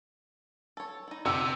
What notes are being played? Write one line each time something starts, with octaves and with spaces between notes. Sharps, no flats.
A4 C#5
D#4 E4
C3 D#4 G4 F#5 E6